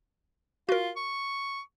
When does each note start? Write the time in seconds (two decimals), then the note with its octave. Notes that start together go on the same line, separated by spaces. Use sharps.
0.69 F4 F#4 A#4
0.97 C#6